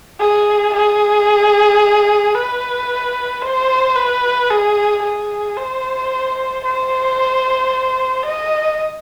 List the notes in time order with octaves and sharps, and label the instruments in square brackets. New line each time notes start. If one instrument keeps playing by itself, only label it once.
[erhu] G#4
G#4
B4
C5
B4
G#4
G#4
C5
C5
D#5